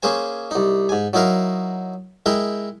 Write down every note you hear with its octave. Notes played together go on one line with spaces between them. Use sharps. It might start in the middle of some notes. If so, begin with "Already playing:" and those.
A#3 C#4 G#4 C5 G#5
C2 D#4
G#2 G#5
F#3 D#4 E4 A#4 F5
G#3 E4 A#4 G5